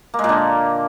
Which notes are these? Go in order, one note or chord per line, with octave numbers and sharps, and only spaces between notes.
A#3
G#3
A#2
D3